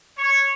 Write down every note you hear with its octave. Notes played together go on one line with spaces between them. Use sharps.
C#5